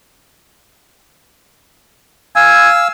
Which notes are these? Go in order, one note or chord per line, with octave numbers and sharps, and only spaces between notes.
F5 G#5 E6